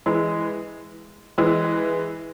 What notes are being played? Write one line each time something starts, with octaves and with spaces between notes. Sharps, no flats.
E3 G#3
E3 G#3